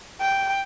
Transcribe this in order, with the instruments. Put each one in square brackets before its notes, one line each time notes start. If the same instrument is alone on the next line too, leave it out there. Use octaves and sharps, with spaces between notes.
[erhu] G5